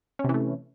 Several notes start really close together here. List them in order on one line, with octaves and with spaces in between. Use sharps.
C#4 C3 E3 A3